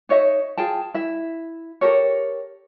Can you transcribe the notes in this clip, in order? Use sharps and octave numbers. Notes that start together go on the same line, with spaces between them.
D#4 C#5 D#5 E5
F4 G#4 G5 A5
E4 E5
G4 A4 A#4 C#5